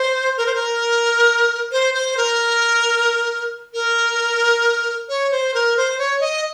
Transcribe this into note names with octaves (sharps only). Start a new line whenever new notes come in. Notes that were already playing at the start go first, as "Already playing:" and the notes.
Already playing: C5
A#4
C5
A#4
C5
C5
A#4
A#4
C#5
C5
A#4
C5
C#5
D#5